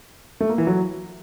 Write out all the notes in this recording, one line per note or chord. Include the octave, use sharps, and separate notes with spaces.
A3
A#3
E3
F#3